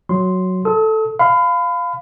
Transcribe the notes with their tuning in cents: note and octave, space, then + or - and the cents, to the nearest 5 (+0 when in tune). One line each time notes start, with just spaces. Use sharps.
F#3 +0 C6 +0
A4 +0 D#6 +45
F5 +0 B5 +30